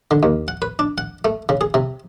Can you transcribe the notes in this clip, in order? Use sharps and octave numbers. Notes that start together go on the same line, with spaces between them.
D3
D#2
F#5
B4
D4
F#5
A3
C#3
G#4
C3